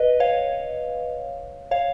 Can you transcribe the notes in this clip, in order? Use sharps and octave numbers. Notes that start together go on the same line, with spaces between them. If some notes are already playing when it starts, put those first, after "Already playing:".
Already playing: B4 D#5
C#5 F5
C#5 F5